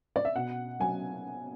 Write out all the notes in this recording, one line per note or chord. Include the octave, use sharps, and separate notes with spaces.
D5
E5
B2 F#5
F#3 G#5